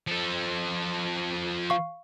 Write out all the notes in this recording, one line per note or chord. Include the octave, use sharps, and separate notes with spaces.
F3 A4
F5 C#6